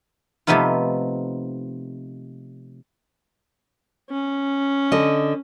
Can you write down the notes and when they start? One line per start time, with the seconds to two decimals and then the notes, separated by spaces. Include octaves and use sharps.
0.47 C3 F3 A3 B3 D#4 F4
4.10 C#4
4.92 D3 D#5